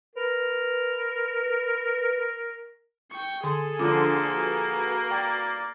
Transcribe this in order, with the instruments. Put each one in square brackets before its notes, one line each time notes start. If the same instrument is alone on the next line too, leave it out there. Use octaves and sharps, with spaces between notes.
[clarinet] A#4 [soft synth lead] B4
[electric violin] G5 C#6
[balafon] D3 C6 [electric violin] G#4 A4
[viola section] D3 F3 C6 [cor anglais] A#3 [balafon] C#4 F4 D6
[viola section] F#4 B4
[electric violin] D5 [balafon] G5